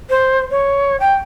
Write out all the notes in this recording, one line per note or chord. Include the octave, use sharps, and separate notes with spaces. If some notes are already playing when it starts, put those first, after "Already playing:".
C5
C#5
G5